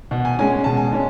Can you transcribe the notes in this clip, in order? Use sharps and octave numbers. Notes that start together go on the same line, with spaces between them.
B2 F#5
G#5
G#3 C#4 G#5
G#5
B2 A5
G#5
G#3 C#4